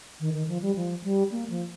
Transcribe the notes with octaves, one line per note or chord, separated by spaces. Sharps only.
D#3
D#3
F3
G3
F3
G3
A#3
F3